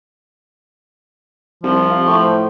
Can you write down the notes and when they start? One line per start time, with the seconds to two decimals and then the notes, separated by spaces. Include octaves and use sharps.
1.63 C2 F3
1.89 F5
2.06 A2 C#6
2.21 C5